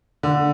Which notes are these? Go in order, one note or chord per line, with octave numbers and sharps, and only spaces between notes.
D3